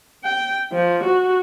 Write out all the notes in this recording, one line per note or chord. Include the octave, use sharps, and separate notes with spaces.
G5
F3
F#4